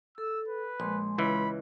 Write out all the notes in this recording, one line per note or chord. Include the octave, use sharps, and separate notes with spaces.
A4 E6
B4
A#1 G#3 C6
C#2 E3 B5